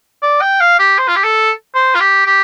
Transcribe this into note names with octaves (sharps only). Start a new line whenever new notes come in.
D5
G5
F5
G4
C5
F4
G4
A4
C5
F4
G4
G4